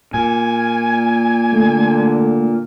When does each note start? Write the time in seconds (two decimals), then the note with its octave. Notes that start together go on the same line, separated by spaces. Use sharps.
0.14 A#2 G#5
1.52 D3 A3